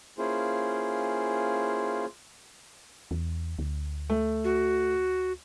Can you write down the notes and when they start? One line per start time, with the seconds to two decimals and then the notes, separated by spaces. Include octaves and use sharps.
0.18 A#3 C#4 E4 F4 G#4 C5
3.11 E2
3.59 D2
4.10 A3
4.44 F#4